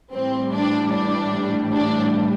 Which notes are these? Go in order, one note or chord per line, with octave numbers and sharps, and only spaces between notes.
A2 E3 G3 C4
D4
D4
D4